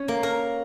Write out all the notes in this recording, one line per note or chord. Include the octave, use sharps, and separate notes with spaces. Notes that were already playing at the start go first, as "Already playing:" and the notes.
Already playing: C#4 C#5
A#3
A#4